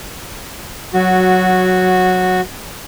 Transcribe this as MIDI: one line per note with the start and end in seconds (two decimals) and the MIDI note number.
0.93 2.40 54
0.93 2.41 66